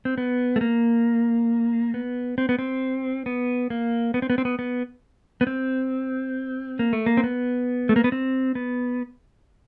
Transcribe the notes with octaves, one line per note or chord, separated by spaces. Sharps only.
C4
B3
A3
A#3
B3
C4
B3
C4
B3
A#3
B3
C4
B3
C4
B3
B3
B3
C4
A#3
A3
A#3
C4
B3
A3
A#3
B3
C4
B3